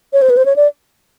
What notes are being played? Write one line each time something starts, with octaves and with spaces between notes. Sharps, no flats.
C#5
C5
B4
C5
C#5
D5